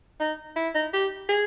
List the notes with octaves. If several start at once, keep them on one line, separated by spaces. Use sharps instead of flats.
D#4
E4
D#4
G4
G#4